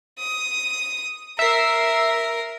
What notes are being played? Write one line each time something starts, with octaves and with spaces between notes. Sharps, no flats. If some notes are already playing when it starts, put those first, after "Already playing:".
D#6
A#4 E5 C7